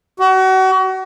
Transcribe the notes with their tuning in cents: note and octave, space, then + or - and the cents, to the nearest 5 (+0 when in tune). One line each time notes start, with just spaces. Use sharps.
F#4 +35